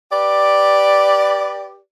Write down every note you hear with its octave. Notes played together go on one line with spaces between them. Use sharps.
G4 B4 D5